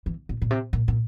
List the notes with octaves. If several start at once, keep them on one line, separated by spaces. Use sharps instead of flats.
E3
A#2
A#2
C3
A#2
A#2